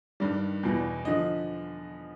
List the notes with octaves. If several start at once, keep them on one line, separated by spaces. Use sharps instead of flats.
G2 D#3 G3 D5
E2 B2 G3
D3 F3 D#5